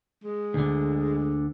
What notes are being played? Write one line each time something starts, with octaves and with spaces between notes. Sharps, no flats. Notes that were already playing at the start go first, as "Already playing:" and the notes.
G#3
D2 D3